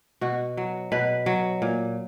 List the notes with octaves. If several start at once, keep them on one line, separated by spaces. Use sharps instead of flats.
B2 F#4
F#3
B2 B4
F#3
A#2